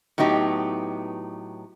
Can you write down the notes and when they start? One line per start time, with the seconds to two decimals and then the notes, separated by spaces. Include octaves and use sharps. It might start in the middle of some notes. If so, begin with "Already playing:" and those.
0.18 A2 F#3 B3 D#4 G4